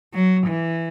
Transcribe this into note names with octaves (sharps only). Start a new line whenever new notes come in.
F#3
E3